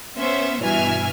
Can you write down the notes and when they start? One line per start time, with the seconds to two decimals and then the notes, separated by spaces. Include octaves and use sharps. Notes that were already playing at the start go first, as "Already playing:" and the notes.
0.18 B3 C#4 C5 E5
0.62 G2 B2 E3 E5 G#5 F6